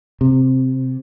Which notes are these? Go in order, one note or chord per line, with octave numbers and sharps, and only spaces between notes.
C3